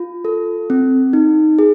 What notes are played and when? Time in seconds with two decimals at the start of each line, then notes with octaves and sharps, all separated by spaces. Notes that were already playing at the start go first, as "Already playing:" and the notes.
Already playing: F4
0.25 A4
0.70 C4
1.13 D#4
1.59 G#4